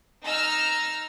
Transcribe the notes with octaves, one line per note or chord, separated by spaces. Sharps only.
D#4 A#5 E6 F6